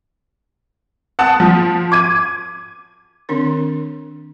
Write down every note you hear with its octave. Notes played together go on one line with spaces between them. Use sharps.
F#5 A5 D#6
F3
D6 G#6 D#7
D#3 C4 D4 A#4